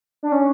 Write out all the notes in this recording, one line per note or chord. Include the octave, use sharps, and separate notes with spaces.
D4
C#4